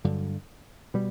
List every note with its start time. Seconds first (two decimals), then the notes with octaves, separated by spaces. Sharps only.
0.04 G2 D3 F#3
0.94 B2 G3